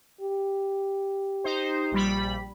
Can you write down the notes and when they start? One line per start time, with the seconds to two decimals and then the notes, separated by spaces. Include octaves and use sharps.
0.21 G4
1.44 D#4 C5
1.92 A#1 G3 B5